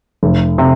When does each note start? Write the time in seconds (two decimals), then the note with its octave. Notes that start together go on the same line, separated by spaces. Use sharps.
0.23 F1
0.58 C3